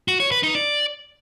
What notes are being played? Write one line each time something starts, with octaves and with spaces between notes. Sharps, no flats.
F#4
C#5
B4
D#4
D5